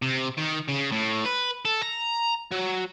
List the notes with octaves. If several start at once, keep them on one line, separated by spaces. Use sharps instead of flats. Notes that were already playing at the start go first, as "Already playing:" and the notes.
C3
D#3
C#3
A2
B4
A4
A#5
F#3